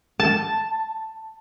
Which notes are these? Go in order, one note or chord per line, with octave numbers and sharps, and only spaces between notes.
A5